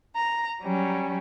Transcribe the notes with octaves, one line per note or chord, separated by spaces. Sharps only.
A#5
F#3 G3 C#4